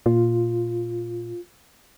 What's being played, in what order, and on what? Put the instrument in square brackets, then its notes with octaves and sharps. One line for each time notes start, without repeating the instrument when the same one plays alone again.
[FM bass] A#2 [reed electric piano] F4